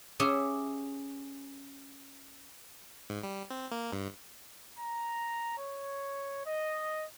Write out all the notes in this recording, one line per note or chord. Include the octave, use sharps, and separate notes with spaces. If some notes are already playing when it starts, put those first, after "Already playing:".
C#4 G4 G#4 E5
G#2
G3
C4
A#3
G2
A#5
C#5
D#5